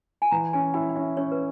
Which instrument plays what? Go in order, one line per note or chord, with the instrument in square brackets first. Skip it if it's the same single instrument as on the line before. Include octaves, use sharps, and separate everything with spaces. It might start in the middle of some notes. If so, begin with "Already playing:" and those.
[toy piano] G#5
[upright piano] E3 [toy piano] A#5
[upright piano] C#4 [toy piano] G#5
[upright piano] E4 [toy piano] G5
[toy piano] G5
[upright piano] C#4 [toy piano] E5
[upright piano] C#4 [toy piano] C#5
[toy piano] B4